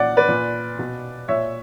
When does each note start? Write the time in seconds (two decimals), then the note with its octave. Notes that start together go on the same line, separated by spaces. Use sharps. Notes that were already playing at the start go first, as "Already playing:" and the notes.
Already playing: A#2 D5 F#5
0.17 B4 D5
0.28 A#2
0.79 B2
1.28 A#2 C#5 E5